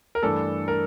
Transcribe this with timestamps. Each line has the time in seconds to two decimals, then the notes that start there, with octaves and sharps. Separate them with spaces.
0.15 A#4
0.23 G2 E3 A3 D4 A4
0.68 A#4